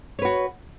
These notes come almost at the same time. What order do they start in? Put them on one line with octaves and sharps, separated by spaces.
C#5 B4 F#4